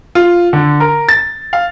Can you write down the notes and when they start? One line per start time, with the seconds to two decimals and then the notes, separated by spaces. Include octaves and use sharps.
0.15 F4
0.53 D3
0.80 A#4
1.09 A6
1.53 F5